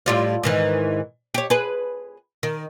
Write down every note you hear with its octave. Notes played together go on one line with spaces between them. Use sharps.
A2 G3 F4
G#2 D#3 E3
G4 C#5
G#4 B4
D#3